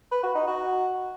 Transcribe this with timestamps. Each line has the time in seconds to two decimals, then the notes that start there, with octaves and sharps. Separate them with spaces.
0.11 B4
0.23 F#4
0.35 D#4
0.47 F#4